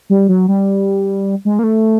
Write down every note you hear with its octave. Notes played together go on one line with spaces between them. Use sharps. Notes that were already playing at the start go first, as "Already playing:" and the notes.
G3
F#3
G3
G#3
A#3
A3